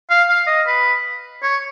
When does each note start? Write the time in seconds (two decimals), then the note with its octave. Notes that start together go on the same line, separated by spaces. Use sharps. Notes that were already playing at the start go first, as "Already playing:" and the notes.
0.10 F5
0.29 F5
0.47 D#5
0.67 B4
1.43 C#5